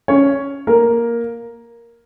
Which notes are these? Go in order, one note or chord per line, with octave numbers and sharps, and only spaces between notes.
C#4 C#5
A#3 A#4